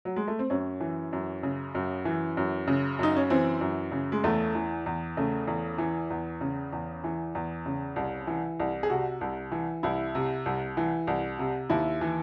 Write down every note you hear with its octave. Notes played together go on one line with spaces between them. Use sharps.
F#3
G#3
A3
C4
F#2 C#4
E3
F#2
C#3
F#2
E3
F#2
C#3
F#2 D#4
C#4
E3 C4
F#2
C#3
G#3
E2 A3
E3
E2
C#3 A3
E2
E3
E2
C#3
E2
E3
E2
C#3
C2
E3
C2
G#4
C3 F#4
C2
E3
C2 E4
C3
C2
E3
C2
C3
D#2 E4
E3